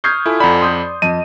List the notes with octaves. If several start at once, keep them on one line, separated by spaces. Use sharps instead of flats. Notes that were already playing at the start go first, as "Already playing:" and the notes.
C#6 D#6 F6 G6 G#6 C7
E4 F4 A4 G#5
F2 D5 F#5 A#5 B5
C6 D#6 G6
F2 D#5 D#7